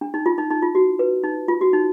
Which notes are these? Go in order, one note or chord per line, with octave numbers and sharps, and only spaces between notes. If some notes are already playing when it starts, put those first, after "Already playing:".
D4
D#4
F4
D#4
D#4
F4
F#4
B4
D#4
F4
F#4
D#4